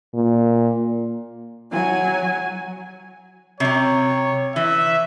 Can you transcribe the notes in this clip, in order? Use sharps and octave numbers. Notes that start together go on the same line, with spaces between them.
A#2
F#3 G#5
C3 F#3 C#5
E3 E5